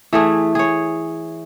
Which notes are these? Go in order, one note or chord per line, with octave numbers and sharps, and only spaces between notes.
E3 A3 G#4
G#4 C#5